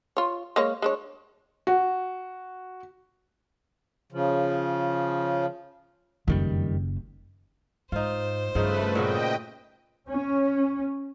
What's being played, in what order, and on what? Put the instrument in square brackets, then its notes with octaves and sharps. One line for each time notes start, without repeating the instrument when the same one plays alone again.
[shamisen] F4 C#5
G#3 A#3 C#5
G#3 D4 C#5
[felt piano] F#4
[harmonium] C#3 F3
[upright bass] F#1 [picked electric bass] F2 D#3 G3
[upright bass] G#2 [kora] D#4 F4 [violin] C5
[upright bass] G2 [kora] C#3 F3 D#4 [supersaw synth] A3 B4
[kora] A#2 C#3 F#4 [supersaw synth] D#5 G5
[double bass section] C#4